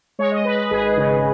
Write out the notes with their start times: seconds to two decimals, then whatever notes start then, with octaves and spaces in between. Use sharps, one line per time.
0.19 G#3 C#5
0.32 D#5
0.45 G#3 B4
0.57 B4
0.71 G#1 G#4
0.97 C#3